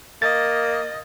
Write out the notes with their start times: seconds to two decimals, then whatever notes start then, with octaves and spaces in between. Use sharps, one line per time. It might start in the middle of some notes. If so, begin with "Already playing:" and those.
0.22 A#3 D#5 A6